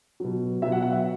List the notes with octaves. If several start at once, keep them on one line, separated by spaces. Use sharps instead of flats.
B2 F#3
B2 F#3 E5
F#5
F#5
E5